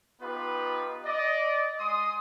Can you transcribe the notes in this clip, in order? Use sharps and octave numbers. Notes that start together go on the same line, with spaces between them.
B3 D#4 F4 G4 B4
D5 D#5
G#3 C6 D#6